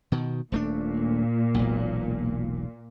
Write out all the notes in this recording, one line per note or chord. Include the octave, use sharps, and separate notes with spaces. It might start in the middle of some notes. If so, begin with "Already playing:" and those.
B2 D#3
D#1 A#2 A3 D4
E1 B1